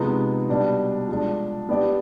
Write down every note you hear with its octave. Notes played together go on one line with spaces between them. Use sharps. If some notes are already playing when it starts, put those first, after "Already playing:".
Already playing: C3 F3 G#3 B3 D#4
B2 G3 D4
F3 G#3 D4
B3 D4 G4 D5